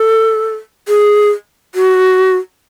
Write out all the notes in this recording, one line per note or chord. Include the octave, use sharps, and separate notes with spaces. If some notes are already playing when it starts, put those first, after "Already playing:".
Already playing: A4
G#4
F#4